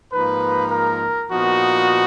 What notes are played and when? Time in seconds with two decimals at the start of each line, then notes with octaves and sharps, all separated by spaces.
0.10 G#2 F3 A#3 D#4 B4
0.70 A#4
1.30 A#2 F3 B3 D#4 F#4